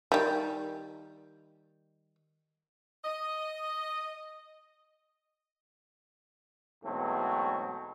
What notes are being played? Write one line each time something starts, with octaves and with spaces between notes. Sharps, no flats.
D#3 G3
D#5
E2 G#2 B2 F#3 A3 C4